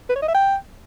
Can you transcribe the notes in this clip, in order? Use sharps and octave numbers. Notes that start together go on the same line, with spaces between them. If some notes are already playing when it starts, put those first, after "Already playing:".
B4
C#5
D#5
E5
G5